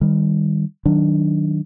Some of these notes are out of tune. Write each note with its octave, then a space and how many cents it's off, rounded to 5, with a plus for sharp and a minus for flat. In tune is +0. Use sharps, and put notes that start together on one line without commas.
D#3 +0 G3 +20
D#3 +0 F#3 +10 D4 +0